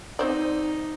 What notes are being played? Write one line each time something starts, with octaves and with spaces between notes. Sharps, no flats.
C4 D#4 C5 D5